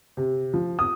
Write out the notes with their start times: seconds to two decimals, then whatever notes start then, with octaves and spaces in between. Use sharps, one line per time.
0.17 C3
0.54 F3
0.79 D#6